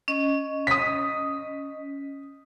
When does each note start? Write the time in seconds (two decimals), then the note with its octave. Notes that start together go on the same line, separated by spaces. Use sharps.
0.08 C#4 D#5
0.67 D#6 B6